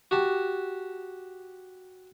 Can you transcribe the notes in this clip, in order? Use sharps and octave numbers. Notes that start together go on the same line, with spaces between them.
F#4 G4 A5